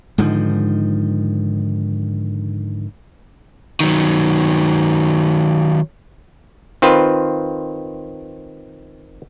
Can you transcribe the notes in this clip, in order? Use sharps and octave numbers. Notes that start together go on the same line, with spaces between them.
G#2 D3 D#3 F3
D#3 F#3
D#3 C4 F4 B4